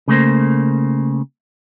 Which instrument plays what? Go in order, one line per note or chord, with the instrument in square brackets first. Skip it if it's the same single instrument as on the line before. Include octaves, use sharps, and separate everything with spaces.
[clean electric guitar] C#3 A3 A#3 C5